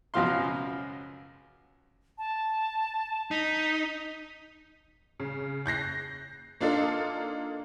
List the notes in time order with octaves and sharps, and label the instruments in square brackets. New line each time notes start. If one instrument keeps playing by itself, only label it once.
[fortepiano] C#2 F#2 B2 F3 F5 C6
[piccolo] A5
[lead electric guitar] D#4 [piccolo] B6
[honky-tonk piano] C#3
F#6 G6 A#6 C7
A#3 D4 D#4 F4 A4